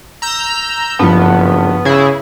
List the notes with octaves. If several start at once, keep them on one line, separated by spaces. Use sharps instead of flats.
A#5 E6 G6
F#1 G2 F3 B3
C#3 E4 G#4